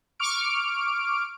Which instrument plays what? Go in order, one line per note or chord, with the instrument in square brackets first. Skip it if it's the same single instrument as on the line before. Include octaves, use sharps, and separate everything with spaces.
[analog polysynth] C#6 D6 F6 D7